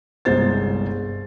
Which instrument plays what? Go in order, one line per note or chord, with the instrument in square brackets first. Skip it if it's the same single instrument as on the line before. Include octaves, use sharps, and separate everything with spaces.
[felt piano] G1 C2 G#3 C5 A6